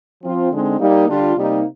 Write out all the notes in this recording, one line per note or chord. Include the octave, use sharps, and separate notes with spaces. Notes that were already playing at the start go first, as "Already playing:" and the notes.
F3 C4 F4
D3 G#3 C4 D#4
G3 A#3 D#4
D3 G3 D4 F4
C3 G3 A#3 D#4